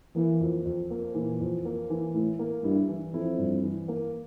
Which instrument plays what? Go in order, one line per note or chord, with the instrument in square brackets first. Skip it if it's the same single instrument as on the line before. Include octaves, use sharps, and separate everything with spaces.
[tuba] E3 [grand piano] A#3
[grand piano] F2
F2
A#3
[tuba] A#2 [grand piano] E3
[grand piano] F2
A#3
E3
[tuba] A2 [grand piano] E4
[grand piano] A#3
[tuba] G2 [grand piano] E4
[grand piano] E3
[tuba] F2 [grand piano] E4
[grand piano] G2
E3
A#3